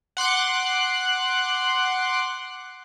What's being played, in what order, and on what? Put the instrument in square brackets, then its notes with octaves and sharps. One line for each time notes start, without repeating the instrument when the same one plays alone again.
[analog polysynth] F#5 C6 D6 F#6